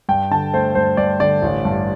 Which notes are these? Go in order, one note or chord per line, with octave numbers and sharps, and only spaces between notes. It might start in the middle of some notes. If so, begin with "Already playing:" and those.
G2 G5
D3 A5
A3 C5
G2 C5
G2 D5
D3 D5
A1
G2